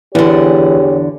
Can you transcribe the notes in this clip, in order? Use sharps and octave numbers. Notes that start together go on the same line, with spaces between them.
E2 D3 E3 G4 G#4 C#5